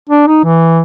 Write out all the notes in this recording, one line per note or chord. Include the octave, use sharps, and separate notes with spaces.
D4
D#4
E3